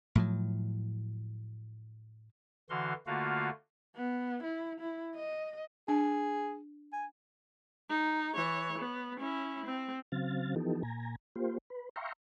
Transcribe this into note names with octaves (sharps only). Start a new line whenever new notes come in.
A2 F3 F#3
D3 E3 F#4 F5 C6
D3 A3 A#3 F4 F#4 F5
B3
E4
E4
D#5
D4 G#4
G#5
D#4
E3 C#5
B3
C#4 E4
C4
C#3 F#3 C4 F5 A6
E3 F3 B3 D#4 G4 A4
A#2 G#5 A#5
A#3 F4 G4 C5
B4
E5 F5 G5 A#5 C6 C#6